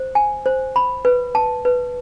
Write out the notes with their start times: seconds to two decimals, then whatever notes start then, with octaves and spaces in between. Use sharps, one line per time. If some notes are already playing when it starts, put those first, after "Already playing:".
Already playing: C5
0.15 G#5
0.46 C5
0.76 B5
1.05 B4
1.35 A5
1.65 B4